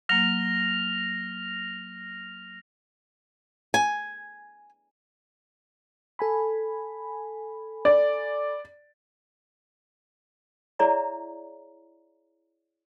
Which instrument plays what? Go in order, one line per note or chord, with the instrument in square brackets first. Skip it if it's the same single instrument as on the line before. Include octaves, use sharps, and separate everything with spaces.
[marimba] F#3 A#3 [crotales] F6 A#6 F7
[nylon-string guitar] G#5
[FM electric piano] A4 G#5 B5
[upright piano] D5
[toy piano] E4 G#4 C#5 D5 E5 A#5